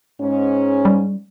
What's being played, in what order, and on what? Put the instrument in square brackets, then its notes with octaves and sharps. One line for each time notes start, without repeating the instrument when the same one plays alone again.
[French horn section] G#2 C#4
[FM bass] G3